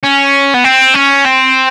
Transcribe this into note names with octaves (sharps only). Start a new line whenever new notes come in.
C#4
B3
C4
C#4
C4